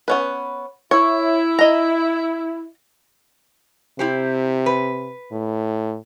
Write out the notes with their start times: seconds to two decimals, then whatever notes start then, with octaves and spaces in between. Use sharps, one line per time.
0.08 B3 C#4 B4
0.91 E4 C#5
1.59 D#5 A#5
3.99 C3 E4 G4 C5
4.66 B4
5.32 A2